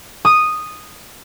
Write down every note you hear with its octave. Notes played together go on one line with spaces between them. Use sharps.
D#6